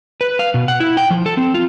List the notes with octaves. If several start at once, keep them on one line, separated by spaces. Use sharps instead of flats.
B4
F5
B2
F#5
E4
G5
F3
A4
C4
F4